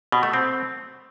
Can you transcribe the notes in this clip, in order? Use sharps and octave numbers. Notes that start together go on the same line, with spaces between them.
B2
A3
C4